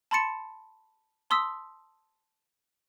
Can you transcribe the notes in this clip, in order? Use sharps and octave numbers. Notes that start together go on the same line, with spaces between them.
A5 B5 C6 A6 C#7 E7
A5 C6 D#6 E6 B6